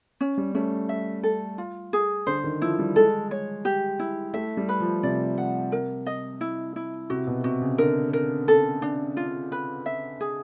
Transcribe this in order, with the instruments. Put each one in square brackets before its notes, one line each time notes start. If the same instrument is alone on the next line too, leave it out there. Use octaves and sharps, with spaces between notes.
[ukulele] C#4
[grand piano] G3
[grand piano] A3 [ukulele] C#4
[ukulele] E5
A4
F4
G#4
[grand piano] D3 [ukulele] C5
[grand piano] D#3
[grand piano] F3 [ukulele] E4
[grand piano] G3
[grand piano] G#3 [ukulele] A4
[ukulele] C#5
G4
E4
[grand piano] A3 [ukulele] E5
[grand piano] G3
[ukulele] B4
[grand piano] F3
[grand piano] C3 [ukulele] D5
[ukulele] F#5
A#4
D#5
E4
E4
[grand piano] C3 [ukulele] F#4
[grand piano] B2
[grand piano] C3 [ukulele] F#4
[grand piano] C#3
[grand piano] D3 [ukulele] A#4
[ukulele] A#4
A4
D4
F4
B4
E5
G#4